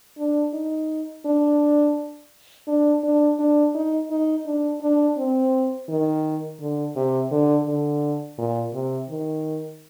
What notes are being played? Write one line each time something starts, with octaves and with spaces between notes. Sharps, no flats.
D4
D#4
D4
D4
D4
D4
D#4
D#4
D4
D4
C4
D#3
D3
C3
D3
D3
A#2
C3
D#3